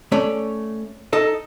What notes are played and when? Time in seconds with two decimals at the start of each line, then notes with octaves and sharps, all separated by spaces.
0.12 A3 C#4 C#5 D5
1.13 D#4 A4 D#5